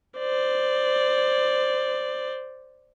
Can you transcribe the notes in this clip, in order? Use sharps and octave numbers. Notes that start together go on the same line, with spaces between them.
C5 D5